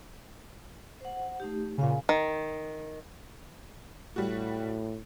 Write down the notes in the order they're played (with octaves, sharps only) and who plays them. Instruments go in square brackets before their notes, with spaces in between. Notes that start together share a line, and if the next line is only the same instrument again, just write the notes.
[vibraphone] C5 F#5
A3 D#4 G4
[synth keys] A#2 C#3 [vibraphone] F5 G#5
[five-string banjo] D#3
[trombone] A2 [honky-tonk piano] G3 F#4